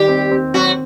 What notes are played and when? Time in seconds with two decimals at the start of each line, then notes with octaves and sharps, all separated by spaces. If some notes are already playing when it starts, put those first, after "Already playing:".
Already playing: D#3 G3 G4
0.08 C4
0.31 C4
0.54 F#3 C4 F#4